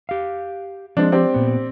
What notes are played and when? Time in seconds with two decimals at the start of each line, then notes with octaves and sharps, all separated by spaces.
0.09 G4 F5
0.97 F3 G#3 C4 D4
1.12 C4 G4 D5
1.34 A#2 B3